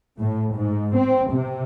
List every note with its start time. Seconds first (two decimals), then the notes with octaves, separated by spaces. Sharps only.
0.19 A2
0.54 G#2
0.97 C4
1.30 C3